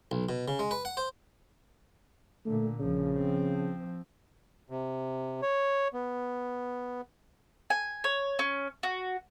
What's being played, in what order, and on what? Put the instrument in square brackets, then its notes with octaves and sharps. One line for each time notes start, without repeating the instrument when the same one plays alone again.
[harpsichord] B1
B2
C#3
G#3
B4
F#5
C5
[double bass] A#2 D3 [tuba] A3
[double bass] A#1 F3 [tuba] C#3
[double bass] F3 C4
[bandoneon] C3
C#5
B3
[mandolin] G#5
C#5
C#4
F#4